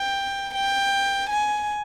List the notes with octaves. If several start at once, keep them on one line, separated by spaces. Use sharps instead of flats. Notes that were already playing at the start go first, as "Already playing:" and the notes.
Already playing: G5
G5
G#5